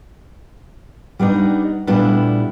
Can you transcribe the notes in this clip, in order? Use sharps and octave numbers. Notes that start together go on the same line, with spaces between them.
G3 B3 D4 D#4
A#2 G3 A3 B3 D4 E4